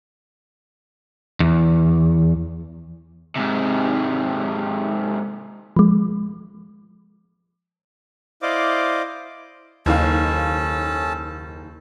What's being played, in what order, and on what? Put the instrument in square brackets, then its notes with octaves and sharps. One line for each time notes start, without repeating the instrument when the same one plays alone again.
[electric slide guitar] E2
[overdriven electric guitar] G#2 C3
[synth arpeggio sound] F3 G#3
[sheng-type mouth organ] E4 C5 D5 D#5 F5 D6
[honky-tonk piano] F#1 D#3 F5 [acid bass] D#2 [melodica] C#4 A4 A5